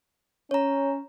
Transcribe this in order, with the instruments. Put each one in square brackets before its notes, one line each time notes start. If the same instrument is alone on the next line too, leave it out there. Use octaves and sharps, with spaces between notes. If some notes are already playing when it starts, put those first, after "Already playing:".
[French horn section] C#4 [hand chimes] C#5 A#5